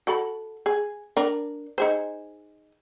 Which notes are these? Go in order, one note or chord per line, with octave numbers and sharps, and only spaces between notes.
F#4 A4 B5
G#4
D4 A#4 D5
D#4 G#4 C5